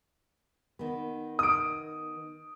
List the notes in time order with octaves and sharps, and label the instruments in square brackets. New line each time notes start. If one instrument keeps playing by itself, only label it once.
[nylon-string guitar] D#3 B3
[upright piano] D#6 D7